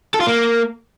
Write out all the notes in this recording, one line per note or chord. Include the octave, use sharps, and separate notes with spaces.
A4
F4
A#3